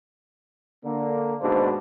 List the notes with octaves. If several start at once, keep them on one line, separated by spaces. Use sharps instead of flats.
D3 A#3
D#2 G#2 B2 D4 C5